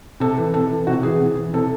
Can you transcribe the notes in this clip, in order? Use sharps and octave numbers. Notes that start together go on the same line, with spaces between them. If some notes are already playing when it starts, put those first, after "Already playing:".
C3 A4
E3
C3 A4
E3
C3 F#4
E3 G#4
C3
E3
C3 A4